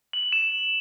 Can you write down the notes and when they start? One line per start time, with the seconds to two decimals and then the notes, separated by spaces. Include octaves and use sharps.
0.13 F#7
0.32 E7